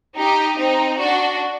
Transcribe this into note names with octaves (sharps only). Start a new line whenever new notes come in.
D#4 G4
C4 D#4
D4 F#4